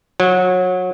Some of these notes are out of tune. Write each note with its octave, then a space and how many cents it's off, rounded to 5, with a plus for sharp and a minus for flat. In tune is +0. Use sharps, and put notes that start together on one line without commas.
F#3 -25